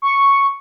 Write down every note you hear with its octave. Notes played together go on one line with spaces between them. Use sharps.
C#6